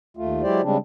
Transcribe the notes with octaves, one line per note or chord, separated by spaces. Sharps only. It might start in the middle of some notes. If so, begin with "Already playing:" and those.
D#2 A3 F4
F#3 G#3 E4 G4 C5 D5
C#3 G3 G#3 C4 D4